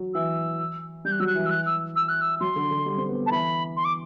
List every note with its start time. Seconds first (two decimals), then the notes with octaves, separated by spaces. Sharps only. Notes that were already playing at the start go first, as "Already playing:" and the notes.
Already playing: F#3
0.14 E3 E6
1.05 G3 G6
1.12 F#6
1.20 F#3 E6
1.27 F#6
1.35 E3
1.46 E6
1.51 F#6
1.66 E6
1.96 E6
2.09 F#6
2.21 E6
2.41 F#3 C6
2.56 D3
2.71 D3
2.86 G3
2.97 C4
3.09 B3
3.26 A5
3.31 E3 B5
3.77 C6
3.85 D6